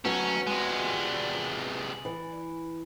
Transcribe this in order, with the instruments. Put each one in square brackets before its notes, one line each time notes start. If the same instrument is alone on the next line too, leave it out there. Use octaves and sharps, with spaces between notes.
[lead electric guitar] F#3 A3 [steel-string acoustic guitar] B3 F#4 [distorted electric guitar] C#4
[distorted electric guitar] C3 G#3 [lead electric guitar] D5 G#5
[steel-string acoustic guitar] E3